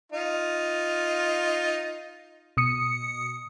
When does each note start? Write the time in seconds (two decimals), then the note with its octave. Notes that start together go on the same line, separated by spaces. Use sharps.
0.12 D#4 F4
2.57 B2 D#6 C#7